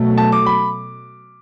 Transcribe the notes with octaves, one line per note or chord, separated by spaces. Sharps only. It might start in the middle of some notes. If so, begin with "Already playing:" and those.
Already playing: B2 F#3 A3
A5
D6
B5